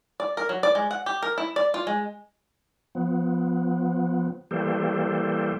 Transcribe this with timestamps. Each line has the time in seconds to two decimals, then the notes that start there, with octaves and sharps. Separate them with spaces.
0.20 D5
0.37 A#4
0.49 F#3
0.63 D5
0.75 G#3
0.91 F#5
1.06 G4
1.23 A#4
1.38 E4
1.56 D5
1.74 F4
1.87 G#3
2.95 F3 B3
4.51 E3 G3 A#3 G4 A4 C5